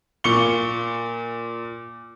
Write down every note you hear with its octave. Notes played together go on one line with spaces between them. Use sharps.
A#2 C#6 C#7 G7